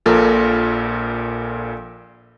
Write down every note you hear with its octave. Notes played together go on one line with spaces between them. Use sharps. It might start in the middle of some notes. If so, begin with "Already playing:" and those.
A#1 A#2 A4 A#4